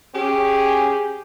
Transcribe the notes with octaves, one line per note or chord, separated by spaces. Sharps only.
C#4 G4 G#4